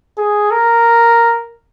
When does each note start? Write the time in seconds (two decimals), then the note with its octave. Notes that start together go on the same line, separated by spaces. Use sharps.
0.18 G#4
0.51 A#4